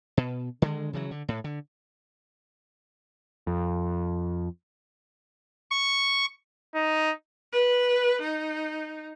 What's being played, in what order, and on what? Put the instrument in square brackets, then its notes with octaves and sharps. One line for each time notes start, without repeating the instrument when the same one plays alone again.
[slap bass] B2
D3 D#3 G#3
C#3 E3 F#3
D3
A2
D3
[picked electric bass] F2
[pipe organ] C#6
[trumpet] D#4
[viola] B4
D#4